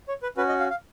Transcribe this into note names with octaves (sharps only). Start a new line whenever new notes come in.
C#5
B4
C#4 F#4 B4
D#5
F5
F5